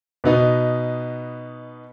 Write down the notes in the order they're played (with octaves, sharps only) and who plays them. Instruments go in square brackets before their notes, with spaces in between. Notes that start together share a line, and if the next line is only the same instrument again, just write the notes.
[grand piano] B2 B3 D#4